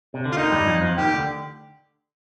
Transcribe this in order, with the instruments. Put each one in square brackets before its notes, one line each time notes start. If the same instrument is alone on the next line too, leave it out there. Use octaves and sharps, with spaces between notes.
[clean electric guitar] C3
D3
[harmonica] F4
[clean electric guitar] D#2 D#3 [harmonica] D#4
[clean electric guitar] G2 G3
F2 F3
F2 F3
[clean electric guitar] D#2 D#3 [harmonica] G4
[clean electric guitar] D2 D3